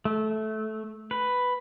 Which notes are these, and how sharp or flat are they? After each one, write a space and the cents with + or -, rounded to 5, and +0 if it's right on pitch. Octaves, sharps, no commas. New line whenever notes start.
A3 -15
B4 +5